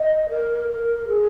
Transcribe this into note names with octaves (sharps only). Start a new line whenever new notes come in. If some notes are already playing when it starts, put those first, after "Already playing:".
Already playing: D#5
A#4
A#4
G#4